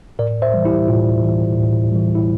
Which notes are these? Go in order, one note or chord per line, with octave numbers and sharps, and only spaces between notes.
A2 A#4 D5
C5 E5
E3 G3
E4 G4
A2 F4
E3 G3
A2
E3 G3
E4